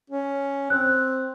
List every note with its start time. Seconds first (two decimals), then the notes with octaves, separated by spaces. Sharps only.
0.10 C#4
0.70 C4 F#6